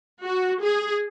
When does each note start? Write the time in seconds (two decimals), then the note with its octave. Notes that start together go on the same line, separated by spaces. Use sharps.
0.24 F#4
0.64 G#4